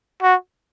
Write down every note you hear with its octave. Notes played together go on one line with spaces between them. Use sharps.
F#4